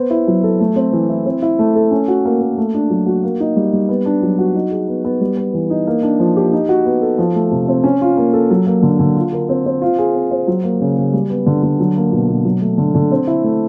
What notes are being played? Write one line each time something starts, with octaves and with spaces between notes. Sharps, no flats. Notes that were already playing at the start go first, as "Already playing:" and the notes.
Already playing: B3 C5
E4
F#3
A4
A3
C4
E3
E4
C4
E4
A3
A4
C#4
F#4
A#3
A#3
A3
D4
F#3
F#4
A#3
D#4
G3
G3
B3
D4
F#3
F#4
D#4
G#4
B3
B3
G3
B3
E3
D#4
A#3
D4
F3
G4
D#4
F#4
B3
A4
F3
A3
C3
C4
C#4
F4
A#3
A4
F#3
A#3
D3
D3
F4
A#4
C4
C4
F4
G#4
C4
C5
F#3
A#3
C#3
C#3
G3
B3
D3
D3
F#3
A#3
B2
B2
F#3
A3
D3
D3
C4
E4
A3